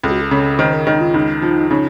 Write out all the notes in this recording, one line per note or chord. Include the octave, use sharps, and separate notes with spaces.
C#2 A4
F#4
A4
C#3 A4
D#3 C5
A#4
D#3 D#4
F4
C#2 D#4
F3
C#3 D#4